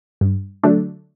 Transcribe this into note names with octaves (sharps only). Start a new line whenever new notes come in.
G2
D3 F#3 A3 D4